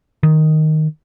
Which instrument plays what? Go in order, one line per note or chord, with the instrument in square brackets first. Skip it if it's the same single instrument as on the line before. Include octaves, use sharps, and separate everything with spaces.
[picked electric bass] D#3